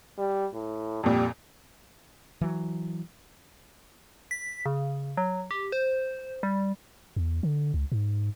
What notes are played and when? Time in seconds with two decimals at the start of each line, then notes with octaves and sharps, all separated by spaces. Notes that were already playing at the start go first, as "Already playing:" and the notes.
0.18 G3
0.53 A2
1.03 F2 A#2 G3
2.41 E3 F#3
4.31 B6
4.66 C#3
5.17 F#3
5.51 G4
5.72 C5
6.43 G3
7.16 E2
7.43 D3
7.74 C#2
7.92 G#2